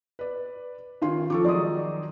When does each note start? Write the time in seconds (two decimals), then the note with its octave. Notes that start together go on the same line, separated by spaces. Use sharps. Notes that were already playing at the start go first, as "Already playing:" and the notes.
0.19 B4 D5
1.02 D#3 C#4 F4 C6
1.30 F3 A4 C#6 D6
1.44 D#3 F#3 G#3 D5 C6 D#6